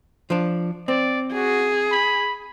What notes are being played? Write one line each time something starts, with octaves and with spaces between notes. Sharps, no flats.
F3 D4
C4 D5
F#4 G#4
B5